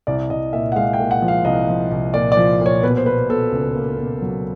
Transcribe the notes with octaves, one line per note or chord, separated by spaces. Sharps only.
C2 D5
C2 D#5
A#2 E5
F#5
G#3 F5
G5
A#2
F#5
F3
F5
C2 D#5
F3
C2
A#2 D5
D5
F3
A#2 C#5
B2 B4
C5
B2 B4
B2 A4
C#2
A#3
B2
F#3